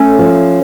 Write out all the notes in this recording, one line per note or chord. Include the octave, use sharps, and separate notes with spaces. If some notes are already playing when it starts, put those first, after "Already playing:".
Already playing: A3 C#4
F3